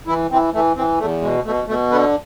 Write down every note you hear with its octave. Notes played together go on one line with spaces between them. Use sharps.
E3 E4
E3 C4
E3 A3
E3 C4
E2 A3
B2 G#3
B2 A3
B2 A3
D3 B3